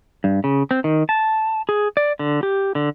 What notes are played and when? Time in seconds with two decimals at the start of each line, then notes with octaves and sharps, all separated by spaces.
0.24 G2
0.44 C#3
0.71 C4
0.84 D#3
1.09 A5
1.69 G#4
1.97 D5
2.19 D3
2.43 G4
2.75 D3